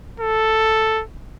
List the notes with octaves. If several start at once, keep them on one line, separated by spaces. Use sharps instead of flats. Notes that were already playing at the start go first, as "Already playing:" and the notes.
A4